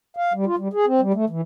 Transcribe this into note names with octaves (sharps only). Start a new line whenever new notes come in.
F5
G3
F4
G3
G#4
C4
G3
A3
E3